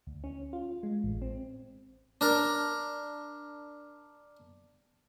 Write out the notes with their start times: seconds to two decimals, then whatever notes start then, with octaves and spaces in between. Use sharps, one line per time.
0.07 D2
0.24 C#4
0.53 F4
0.83 G#3
1.04 A1
1.22 C4
2.21 D4 A#4